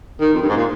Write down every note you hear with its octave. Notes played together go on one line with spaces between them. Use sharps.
D#3
F2
G2
G#2
A#2